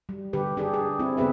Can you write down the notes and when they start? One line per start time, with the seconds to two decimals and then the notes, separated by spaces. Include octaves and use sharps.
0.09 G3
0.33 D3 G4 B4
0.57 D4 G4 G#4
0.74 G#4
0.99 C4 E4
1.17 C#3 B3 G#4 B4 E5